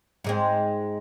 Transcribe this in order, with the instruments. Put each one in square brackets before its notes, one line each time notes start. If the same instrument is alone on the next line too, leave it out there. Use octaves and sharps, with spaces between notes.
[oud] G#2 G#3 C4